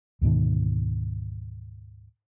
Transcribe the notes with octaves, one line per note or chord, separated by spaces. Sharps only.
D2 G#2 B2 D#3